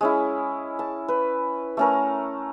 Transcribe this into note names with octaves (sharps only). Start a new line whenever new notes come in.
G#3 C#4 E4
A5
B4
A3 C#4 A#4